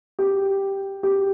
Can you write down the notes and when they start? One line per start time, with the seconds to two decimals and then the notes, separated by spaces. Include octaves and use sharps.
0.19 G4
1.03 G4